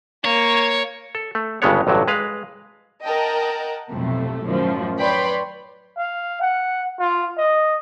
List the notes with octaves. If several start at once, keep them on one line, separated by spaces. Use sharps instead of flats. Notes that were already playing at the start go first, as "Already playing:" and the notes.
A#3 C#5
A4
A3
G1 G2 C#3 G#3 B3 C#5
A1 G2 D3 F#3
G#3 B4 F5
A#4 D#5 F#5 G5 A5
B1 F2 A2 C3 A3
F#2 A2 D#3 F3
B4 C#5 D5 G5 B5 C6
F5
F#5
F4
D#5